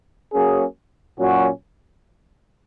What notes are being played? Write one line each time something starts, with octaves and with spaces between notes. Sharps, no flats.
F#3 A#3 C#4 G#4
A#2 F#3 C#4 F#4